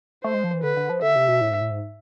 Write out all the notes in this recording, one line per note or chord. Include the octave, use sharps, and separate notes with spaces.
A3 C5
G#3
F3
E3
D3 B4
D3
F3
D3 E5
C3
B2
A2
G#2
A2
G#2